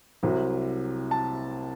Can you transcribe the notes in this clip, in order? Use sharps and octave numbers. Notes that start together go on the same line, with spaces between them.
C2 C3 F#3
A5